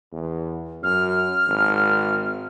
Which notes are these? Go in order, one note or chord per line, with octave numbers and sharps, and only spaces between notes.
E2
F#2 F6
G#1